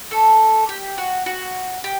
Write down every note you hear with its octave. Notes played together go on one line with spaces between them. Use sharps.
A3 A4
G4
F#4
F#4
G4